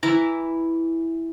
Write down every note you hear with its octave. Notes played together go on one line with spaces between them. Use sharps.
E3 E4 A#5 D6